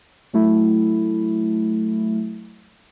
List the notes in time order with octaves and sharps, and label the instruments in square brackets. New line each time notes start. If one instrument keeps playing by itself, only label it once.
[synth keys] F#3 A3 E4